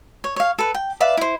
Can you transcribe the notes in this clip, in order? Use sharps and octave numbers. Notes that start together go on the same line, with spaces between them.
C#5
C#5 F5
A4 B4
G5
B4 D5 E5 F5
E4 C5